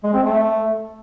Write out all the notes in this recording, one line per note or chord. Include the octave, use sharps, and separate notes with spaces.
G#3
C4
A3